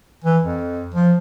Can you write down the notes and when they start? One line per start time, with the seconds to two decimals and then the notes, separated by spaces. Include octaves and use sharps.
0.24 E3
0.44 F2
0.94 F3